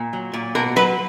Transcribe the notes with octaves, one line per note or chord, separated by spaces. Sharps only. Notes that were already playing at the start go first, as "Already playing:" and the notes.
Already playing: A#2
F#3
A#2
B2 A#4
F#3 B4